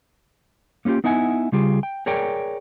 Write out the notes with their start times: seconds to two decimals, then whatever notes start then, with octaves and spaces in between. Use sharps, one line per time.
0.85 A#3 C#4 D#4 F4 G4
1.04 B3 D#4 E4 F#5 G#5
1.52 C#3 G3 F4 G4 G#4
1.83 G5
2.06 G#4 A#4 C#5 D5 G5